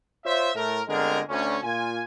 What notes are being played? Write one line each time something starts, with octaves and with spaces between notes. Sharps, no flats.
F4 C5 C#5 E5
A2 A3 A#4
G1 D3 G#3 C4 G#4 A#4
D2 C#4
A#2 F4 G#5